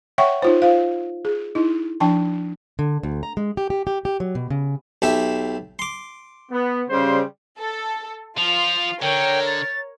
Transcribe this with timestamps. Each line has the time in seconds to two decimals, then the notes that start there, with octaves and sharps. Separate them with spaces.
0.18 C#5 E5 F#5 G5 C#6
0.42 D#4 F4 C5
0.62 F4 C5 F5
1.25 G#4
1.55 D#4 E4
2.00 F3 D4 G5 A5
2.79 D3
3.03 D2
3.23 A#5
3.37 G#3
3.57 G4
3.70 G4
3.87 G4
4.05 G4
4.20 F#3
4.35 B2
4.50 C#3
5.02 B1 G4 E5
5.79 C6 D6
6.51 B3
6.89 C#3 G3 C5
7.59 A4
8.38 F3 F4 F7
9.02 D3 A#4 C#5 G5
9.47 A6